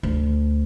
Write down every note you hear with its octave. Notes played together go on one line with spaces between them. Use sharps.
D2